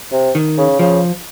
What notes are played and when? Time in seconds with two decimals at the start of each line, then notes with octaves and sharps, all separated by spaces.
0.12 C3
0.35 D#3
0.58 C#3
0.79 C#3 F3